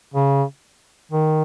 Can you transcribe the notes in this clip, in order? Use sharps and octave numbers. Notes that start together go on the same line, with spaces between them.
C#3
D#3